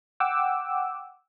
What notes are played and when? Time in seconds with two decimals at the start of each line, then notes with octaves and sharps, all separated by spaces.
0.20 F#5 G5 D6 E6